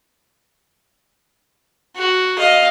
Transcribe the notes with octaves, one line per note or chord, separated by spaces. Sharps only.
F#4
D#5 F5